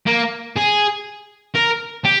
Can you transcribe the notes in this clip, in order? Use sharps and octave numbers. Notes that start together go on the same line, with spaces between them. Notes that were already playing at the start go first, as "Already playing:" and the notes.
A#3
G#4
A#4
G4